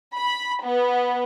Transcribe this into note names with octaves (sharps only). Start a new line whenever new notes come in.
B5
B3